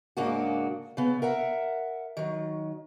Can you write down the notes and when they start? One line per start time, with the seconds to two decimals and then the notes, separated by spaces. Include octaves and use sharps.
0.17 G#2 C#3 A#3 D4 F#4
0.97 C#3 B3
1.22 A#4 E5 F#5
2.17 D#3 F#3